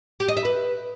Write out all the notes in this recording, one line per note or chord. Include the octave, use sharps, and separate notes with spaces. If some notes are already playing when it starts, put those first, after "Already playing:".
G4
D#5
E5
B4